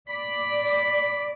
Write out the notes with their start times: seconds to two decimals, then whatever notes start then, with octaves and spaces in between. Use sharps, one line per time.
0.10 D5 B5